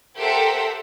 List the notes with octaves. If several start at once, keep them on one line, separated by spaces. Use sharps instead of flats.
G4 A4 A#4 C5 E5 F#5